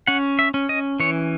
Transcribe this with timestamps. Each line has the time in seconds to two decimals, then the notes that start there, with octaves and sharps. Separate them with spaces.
0.07 C#4 F#5
0.39 E5
0.54 C#4
0.69 D#5
1.00 E3 C#5